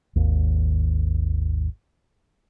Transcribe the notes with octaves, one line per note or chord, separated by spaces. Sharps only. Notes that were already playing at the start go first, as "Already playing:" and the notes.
G#1 D#2